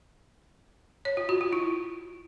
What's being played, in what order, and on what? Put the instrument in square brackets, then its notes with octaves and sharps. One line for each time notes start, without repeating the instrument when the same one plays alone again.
[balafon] C#5
F4
F#4
F4
E4